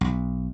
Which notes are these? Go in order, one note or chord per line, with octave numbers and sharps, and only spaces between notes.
B1